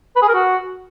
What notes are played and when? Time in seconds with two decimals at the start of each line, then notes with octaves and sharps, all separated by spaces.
0.16 B4
0.22 G#4
0.28 A#4
0.34 F#4